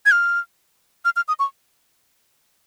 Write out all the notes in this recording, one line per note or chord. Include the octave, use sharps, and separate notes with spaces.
G#6
F6
F6
F6
D#6
C#6